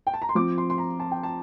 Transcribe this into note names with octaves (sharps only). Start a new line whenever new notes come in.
G5
A5
A#5
C6
F3 C4 F4 D6
C6
C6
A#5
A5
G5
A5